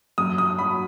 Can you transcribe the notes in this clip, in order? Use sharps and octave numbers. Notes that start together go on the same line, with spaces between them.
F#2 D#6
D#6
F#3 B5